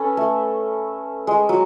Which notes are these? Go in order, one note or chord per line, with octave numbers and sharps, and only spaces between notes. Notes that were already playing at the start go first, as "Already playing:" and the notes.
Already playing: C#4 A4 B4 C#5
A3
G#3
F#3